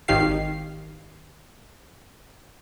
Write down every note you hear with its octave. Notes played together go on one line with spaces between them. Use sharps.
G#1 D#3 G4 F5 C7